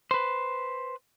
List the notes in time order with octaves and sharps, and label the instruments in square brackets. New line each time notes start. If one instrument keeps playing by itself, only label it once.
[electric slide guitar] B4 C5